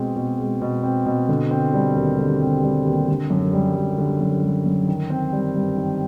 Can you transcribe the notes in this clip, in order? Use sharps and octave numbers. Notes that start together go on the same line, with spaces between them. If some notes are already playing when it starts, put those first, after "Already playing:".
Already playing: B2 G#3 C4
B2
G#3
B2
C4
B2
D3
C4
G3
D#2
D3
C4
G3
D#2
D3
F#2
G3
F#2
D3
F#2
G3
F#2
D#3
C4
G3
G2
D#3